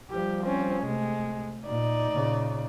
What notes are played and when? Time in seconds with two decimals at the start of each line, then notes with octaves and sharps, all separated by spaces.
0.11 F3 G3 G4
0.44 C4 C#4
0.83 C3 G#3 A3
1.66 A#2 D#4 D5
2.10 A#2 C#3